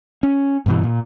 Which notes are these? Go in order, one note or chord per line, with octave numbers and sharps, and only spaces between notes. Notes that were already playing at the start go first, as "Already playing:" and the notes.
C#4
G2 B2 E3
A#2